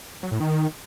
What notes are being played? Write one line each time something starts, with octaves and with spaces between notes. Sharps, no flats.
F#3
A2
D#3